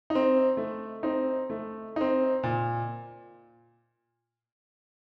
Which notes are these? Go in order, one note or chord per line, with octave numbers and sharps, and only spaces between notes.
D#4
C4
A3
C4 D#4
A3
C4 D#4
A#2